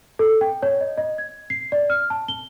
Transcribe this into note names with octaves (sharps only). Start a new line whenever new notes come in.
A4
G5
C#5
D#5
D#5
G#6
C7
D5
F6
A5
G7